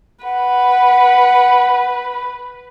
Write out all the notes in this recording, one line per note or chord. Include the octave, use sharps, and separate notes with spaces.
B4 F#5